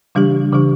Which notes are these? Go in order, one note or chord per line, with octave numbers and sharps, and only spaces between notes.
C#3 E3 G3 D4 G4
C#3 E3 G3 D4 G4